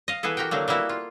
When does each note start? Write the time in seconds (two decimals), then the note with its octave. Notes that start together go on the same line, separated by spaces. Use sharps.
0.08 D#5 F5
0.23 E3 B3 E4 G#4 A4
0.37 F#4 G4 A#4 F#5 G5
0.51 D3 F#3 A3 A#3
0.68 G3 A#3 B3 E4 F#4 A4
0.89 F4